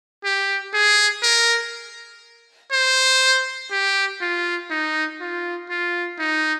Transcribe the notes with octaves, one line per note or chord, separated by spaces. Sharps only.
G4
G#4
A#4
C5
G4
F4
D#4
F4
F4
D#4